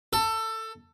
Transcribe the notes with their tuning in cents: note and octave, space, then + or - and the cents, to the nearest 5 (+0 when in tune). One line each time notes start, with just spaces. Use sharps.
A4 +20